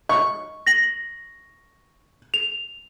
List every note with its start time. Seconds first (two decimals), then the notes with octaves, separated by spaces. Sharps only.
0.09 D#5 C#6
0.67 A#6 F#7
2.34 F7